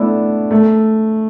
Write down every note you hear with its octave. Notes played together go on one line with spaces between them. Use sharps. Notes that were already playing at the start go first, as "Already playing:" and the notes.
Already playing: A3 B3 D4 E4
A3